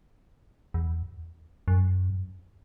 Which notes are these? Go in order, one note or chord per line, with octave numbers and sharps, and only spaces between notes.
E2
F#2